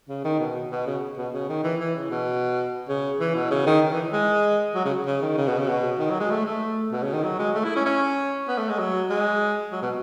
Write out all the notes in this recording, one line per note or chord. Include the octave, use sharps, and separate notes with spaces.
C#3
D#3
B2
B2
C#3
B2
C#3
D#3
E3
E3
C#3
B2
C#3
E3
B2
C#3
D#3
D#3
E3
G#3
F#3
C#3
C#3
D#3
C#3
B2
C#3
B2
D#3
F#3
G#3
A3
A3
B2
C#3
D#3
F#3
G#3
A3
E4
C#4
C#4
B3
A3
G#3
F#3
G#3
F#3
B2